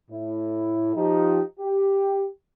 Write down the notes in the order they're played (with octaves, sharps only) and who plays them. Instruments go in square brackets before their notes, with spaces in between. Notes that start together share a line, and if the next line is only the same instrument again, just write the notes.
[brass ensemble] A2 E4
F3 D#4 G4
G4